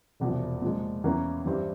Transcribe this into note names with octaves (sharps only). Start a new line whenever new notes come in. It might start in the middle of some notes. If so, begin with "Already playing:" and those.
E1 E2 C3 F3
A#2 F3 G#3
E2 E3 A#3 C#4
G2 E3 G3 C4